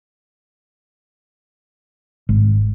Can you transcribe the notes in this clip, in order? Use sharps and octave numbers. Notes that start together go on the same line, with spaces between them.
G#1